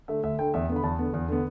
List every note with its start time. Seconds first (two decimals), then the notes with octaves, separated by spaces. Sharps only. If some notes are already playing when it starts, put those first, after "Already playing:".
0.08 D3 A3 E5
0.23 D2 E5
0.39 D3 A3 G5
0.54 E2 E5
0.69 D3 B3
0.76 B5
0.83 E2 A5
0.99 D3 B3
1.14 E2
1.28 D3 B3